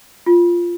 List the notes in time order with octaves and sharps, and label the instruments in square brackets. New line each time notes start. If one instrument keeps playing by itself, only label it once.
[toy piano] F4